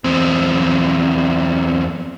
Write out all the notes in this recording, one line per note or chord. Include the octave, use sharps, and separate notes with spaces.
E2 C4